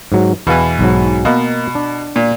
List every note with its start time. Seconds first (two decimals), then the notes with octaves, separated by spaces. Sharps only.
0.12 G#2 F#3
0.47 E2 B2 E3 B4 F5
0.79 B1 G#2 F#3
1.25 B2 A#3 D#5 F5
1.75 D4
2.16 A#2